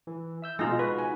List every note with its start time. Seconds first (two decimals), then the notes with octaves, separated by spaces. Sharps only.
0.07 E3
0.42 E5 E6 G6
0.59 B2 G#3 D#4 F4 A#6
0.79 F#4 B4
0.98 G#5